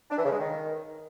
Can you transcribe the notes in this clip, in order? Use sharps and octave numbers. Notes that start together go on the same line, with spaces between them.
D4
E3
C#3
G#3
D#3